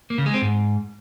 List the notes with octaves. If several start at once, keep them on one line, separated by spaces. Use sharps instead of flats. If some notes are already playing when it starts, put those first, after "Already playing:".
A#3
C#3
G#3
C4
G#2